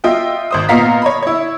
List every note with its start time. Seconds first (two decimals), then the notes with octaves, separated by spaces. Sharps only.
0.04 F4 D#5 E5 G5
0.51 G#1 C5 D#6
0.69 A#2 B3 D#5 F5 A#5 B6
1.02 C#5 D#5 B5
1.23 E4 C#5